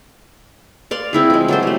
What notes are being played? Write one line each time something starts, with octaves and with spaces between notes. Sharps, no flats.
D5 F5 C6
C4 E4 G#4
F3 G#3
F#3 A4 C5
G3 A3